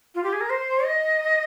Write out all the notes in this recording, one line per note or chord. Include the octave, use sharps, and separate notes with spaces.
F4
G4
G#4
A#4
C5
D#5